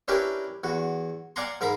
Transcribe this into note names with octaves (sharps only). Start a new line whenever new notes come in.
C#4 D4 E4 G4 A#4 B4
E2 F#4
D5 F5 F#5 G#5 A#5 C6
G#2 A#4 F5 A#5 B5